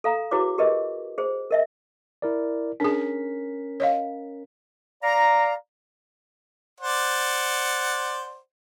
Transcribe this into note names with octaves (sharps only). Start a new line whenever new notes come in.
A4 F5 A#5
E4 F#4 G#4 B4 C#5 D6
G4 G#4 A#4 B4 D#5
G#4 C5
A#4 D#5 E5
E4 A#4 D5
C#4 D4 G#4 A#4 B6
C#5 D#5 F5
D5 F5 A#5
C5 D5 F#5